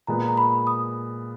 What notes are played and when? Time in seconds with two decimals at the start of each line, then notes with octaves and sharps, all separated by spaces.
0.07 A#2 G#3 B3 A#5
0.28 A#5
0.37 B5
0.67 D#6